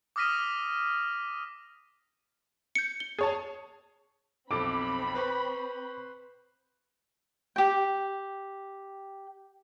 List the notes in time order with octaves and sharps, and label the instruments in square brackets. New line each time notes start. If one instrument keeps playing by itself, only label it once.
[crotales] D6 D#6 F6 A#6 B6 D#7
[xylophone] G6 C#7
G7
[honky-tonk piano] G#4 C#5 A5
[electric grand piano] B1 F2 A4 [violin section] C4 B5 [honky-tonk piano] D6
[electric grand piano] B4 C5 C#6
[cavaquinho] G4 G5